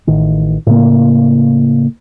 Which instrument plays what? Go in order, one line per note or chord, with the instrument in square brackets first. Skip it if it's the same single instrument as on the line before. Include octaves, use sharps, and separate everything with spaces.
[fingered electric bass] A1 D#3
A2 C#3 A#3